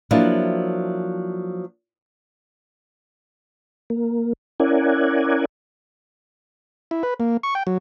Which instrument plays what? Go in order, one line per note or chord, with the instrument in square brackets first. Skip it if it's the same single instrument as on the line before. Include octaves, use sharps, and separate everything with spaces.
[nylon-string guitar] F3 F#3 A#3 D4 E4
[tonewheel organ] A#3
C#4 E4 A#4 D5 F#5 G#5
[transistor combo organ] E4
B4
A#3
C#6
G5
F#3